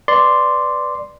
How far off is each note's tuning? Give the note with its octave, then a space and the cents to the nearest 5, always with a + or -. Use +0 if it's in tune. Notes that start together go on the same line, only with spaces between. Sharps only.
B4 +0 D5 +0 C6 -5